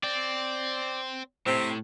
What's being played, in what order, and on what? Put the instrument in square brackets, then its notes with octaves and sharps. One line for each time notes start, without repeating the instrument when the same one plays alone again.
[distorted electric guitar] C4 [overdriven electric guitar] D5
[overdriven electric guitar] A2 [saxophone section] C3 C4